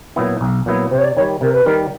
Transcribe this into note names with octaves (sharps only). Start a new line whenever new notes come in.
A#2 F#3 B3 E4
B1
A#2 F#3 B3 E4
C3 C5
C#5
D5
D#3 G3 C#5
C3 A#4
B4
D#3 G3 A#4